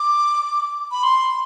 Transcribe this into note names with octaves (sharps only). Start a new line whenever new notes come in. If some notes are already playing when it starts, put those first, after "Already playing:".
Already playing: D6
B5
C6